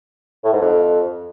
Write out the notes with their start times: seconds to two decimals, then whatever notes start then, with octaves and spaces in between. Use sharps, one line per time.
0.44 A2
0.53 G#2
0.61 F2